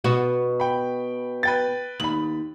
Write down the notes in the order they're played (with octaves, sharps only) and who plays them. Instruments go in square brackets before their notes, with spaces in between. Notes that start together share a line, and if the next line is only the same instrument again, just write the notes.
[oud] B2 B3 F#4
[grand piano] G5 B5
B4 G5 A6
[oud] D#2 [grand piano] B5 F#7